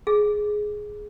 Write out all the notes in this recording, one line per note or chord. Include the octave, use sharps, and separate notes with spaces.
G#4